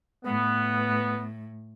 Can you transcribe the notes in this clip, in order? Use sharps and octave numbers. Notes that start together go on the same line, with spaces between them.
A2 B3